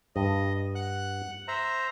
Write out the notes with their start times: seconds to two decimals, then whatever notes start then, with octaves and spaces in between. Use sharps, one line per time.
0.16 G2 D#5
0.75 F#5 F#6
1.48 C5 E5 A#5